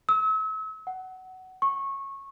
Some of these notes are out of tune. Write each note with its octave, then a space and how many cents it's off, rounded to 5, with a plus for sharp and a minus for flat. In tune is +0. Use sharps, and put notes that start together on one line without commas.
E6 -40
F#5 +15
C#6 -20